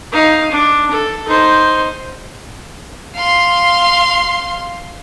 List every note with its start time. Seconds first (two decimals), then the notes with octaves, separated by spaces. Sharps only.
0.12 D#4 F5
0.50 D4
0.91 A4
1.28 D#4 C5
3.16 F5 C6